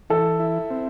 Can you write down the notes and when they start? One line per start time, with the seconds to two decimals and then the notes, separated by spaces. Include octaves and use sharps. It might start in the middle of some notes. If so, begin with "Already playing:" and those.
0.10 E3 A4
0.40 E4
0.70 C4